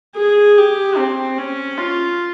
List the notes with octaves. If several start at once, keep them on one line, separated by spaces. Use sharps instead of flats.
G#4
G4
C4
C#4
F4